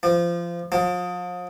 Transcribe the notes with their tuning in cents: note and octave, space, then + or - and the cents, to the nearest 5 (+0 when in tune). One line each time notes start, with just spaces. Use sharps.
F3 -20
F3 +40